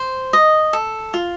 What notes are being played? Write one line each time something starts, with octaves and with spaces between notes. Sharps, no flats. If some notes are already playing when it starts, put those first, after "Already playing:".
Already playing: C5
D#5
A4
F4